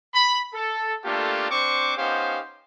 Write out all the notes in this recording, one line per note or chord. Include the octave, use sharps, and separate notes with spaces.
B5
A4
A3 A#3 D4 F4 G4 A4
C4 D4 C5 C#6 D6
B3 C#4 D#4 G4 C5 F5